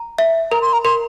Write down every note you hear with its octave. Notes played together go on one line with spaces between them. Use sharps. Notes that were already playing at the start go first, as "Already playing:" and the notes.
Already playing: A#5
E5
A#4 A#5
C6
A#5
A#4 C6